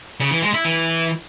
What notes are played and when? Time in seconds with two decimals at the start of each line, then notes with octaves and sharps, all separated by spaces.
0.20 C#3
0.31 E3
0.43 G#3
0.54 E4
0.65 E3